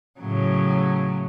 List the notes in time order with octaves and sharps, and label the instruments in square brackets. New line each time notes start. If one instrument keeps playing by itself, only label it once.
[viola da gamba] A2 C#3 F#3